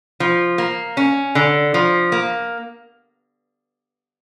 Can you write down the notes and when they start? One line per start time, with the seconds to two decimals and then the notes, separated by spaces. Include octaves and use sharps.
0.20 F3
0.58 A#3
0.97 C#4
1.35 D3
1.74 F3
2.12 A#3